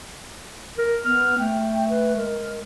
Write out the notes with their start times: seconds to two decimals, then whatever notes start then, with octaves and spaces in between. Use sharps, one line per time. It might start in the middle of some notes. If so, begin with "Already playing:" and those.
0.78 A#4
1.05 B3 F6
1.38 A3 G5
1.89 B4
2.16 G#3 A#4